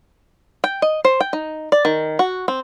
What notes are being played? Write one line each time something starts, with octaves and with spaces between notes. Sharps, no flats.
G5
D#5
C5
G5
D#4
D5
D#3
F#4
C4